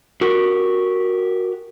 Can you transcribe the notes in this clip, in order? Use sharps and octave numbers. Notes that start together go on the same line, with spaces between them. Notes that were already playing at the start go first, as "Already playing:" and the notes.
F#4 G4 A#4